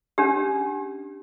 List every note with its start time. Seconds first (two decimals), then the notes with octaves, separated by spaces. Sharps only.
0.18 C#4 D4 G4